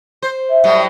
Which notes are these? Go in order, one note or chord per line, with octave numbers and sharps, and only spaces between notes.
C5
E5
A2 F#3 G3